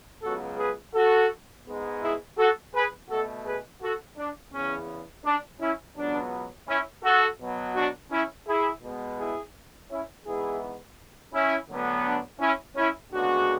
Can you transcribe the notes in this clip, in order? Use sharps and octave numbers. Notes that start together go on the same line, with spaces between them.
C#2 C#3 F#3 B3 F#4 A4
G#4 B4
F#4 A4
G#2 G#3 B3
E4 G#4
F#4 A4
G#4 B4
B2 A3 F#4 A4
G#4 B4
F#4 A4
D4
E2 C#3 E3 B3 C#4
D4
C#4 E4
C#2 B2 F#3 B3 D4
C#4 E4
F#4 A4
B2 F#3 B3
D4 F#4
C#4 E4
E4 G#4
B2 G#3 B3
E4 G#4
C#4 E4
G#2 E3 B3 E4 G#4
C#4 E4
D2 D3 F#3 B3
D4
C#4 E4
C#4 E4
D2 C#3 G#3 B3 D4 F#4